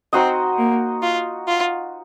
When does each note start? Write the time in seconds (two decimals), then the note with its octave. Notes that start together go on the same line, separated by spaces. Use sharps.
0.13 C4 D#4 F#4 C5 D#5
0.58 A#3
1.02 F4
1.48 F4